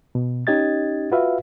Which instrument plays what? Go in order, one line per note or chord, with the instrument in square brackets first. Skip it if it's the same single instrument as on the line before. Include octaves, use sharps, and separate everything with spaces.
[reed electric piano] B2
C#4 D#4 G4 D#5 G#6 A6
F4 F#4 B4 E5 F5